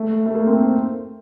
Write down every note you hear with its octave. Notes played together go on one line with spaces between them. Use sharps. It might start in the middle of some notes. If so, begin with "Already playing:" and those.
Already playing: A3
A3
A#3
C4
C4